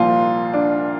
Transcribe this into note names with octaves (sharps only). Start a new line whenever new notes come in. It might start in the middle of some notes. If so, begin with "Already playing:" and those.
Already playing: C2 A#2 F3 F4
D4